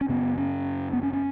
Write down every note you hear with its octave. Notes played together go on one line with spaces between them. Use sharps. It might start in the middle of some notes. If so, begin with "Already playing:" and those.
C#4
F#2 C#3 B3
C#4
B3
C#4
C#4